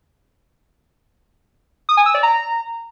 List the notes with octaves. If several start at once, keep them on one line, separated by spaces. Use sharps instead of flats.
D#6
G#5
E6
D5
A#5